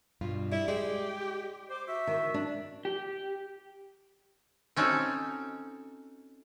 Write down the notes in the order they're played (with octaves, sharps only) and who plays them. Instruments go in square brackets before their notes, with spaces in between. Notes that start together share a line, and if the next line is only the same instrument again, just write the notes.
[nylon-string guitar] G2 B2 F4
[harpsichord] G3 [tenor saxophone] E4
[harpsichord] G#3 [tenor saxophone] G4 [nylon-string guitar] D5
[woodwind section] C5 D6
F#4 E5
[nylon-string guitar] D#3
D4
[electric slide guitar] G4
[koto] C4 C#4 D#4 F#4 A4